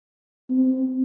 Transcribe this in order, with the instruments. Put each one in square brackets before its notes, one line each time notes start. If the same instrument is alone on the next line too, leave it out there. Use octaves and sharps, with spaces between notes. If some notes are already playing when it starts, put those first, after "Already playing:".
[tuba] C4